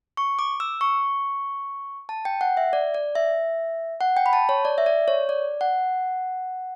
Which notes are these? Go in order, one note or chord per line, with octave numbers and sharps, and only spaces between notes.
C#6
D6
E6
C#6
A5
G5
F#5
E5
D5
D5
E5
F#5
G5
B5
A5
C#5
D5
E5
D5
C#5
D5
F#5